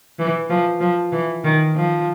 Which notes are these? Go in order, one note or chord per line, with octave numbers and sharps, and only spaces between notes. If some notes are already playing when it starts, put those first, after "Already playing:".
E3
F3
F3
E3
D#3
F3